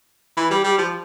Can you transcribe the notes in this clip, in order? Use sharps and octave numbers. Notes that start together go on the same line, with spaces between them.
E3
G3
G3
F3